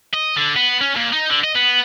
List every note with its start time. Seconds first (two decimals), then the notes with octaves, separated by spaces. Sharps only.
0.14 D#5
0.36 D3
0.56 B3
0.81 C#4
0.96 A#2
1.12 D#4
1.30 D3
1.44 D#5
1.55 B3